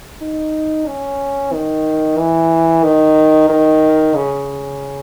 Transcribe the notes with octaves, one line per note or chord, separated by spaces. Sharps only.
D#4
C#4
D#3
E3
D#3
D#3
C#3